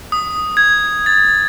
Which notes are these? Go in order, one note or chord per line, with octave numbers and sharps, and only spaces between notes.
D#6
G#6
A6